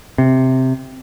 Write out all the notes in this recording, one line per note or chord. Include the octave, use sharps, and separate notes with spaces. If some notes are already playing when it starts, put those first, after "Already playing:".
C3